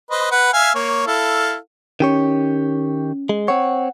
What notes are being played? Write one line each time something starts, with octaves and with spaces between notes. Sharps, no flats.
B4 C5 D#5
B4 F#5
E5 F5 G#5
A#3 C#5
E4 A4 F5
D#3 C#4 G4 C#5
G#3
C4 C#5 F#5